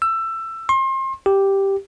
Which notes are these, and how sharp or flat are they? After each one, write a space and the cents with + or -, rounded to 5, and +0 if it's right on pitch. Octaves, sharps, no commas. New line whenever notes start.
E6 +20
C6 +35
G4 +0